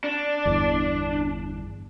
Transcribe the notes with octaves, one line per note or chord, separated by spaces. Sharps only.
D4
G1 E2